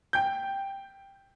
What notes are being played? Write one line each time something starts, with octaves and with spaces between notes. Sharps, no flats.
G5 G6